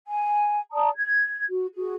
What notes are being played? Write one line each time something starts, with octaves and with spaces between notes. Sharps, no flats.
G#5
D5 A5 A#5 D#6
G#6
F#4
F#4 G#4